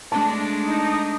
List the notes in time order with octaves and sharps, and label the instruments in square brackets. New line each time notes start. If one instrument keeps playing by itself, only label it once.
[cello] G#3 A3 [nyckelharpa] D4 [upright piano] A5
[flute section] D#4 D#6